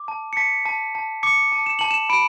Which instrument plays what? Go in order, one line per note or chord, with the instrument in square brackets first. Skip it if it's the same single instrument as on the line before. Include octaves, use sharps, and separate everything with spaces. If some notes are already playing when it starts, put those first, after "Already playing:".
Already playing: [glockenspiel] D6
A5
C#7
A5 B6
A5
A5
D6 C#7
A5
E7
A5 F#7
E7
B5 D7